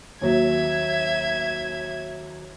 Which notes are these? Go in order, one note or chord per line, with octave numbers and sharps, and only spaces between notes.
D#2 F#3 E5 G#6